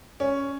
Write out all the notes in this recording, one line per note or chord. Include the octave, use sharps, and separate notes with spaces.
C#4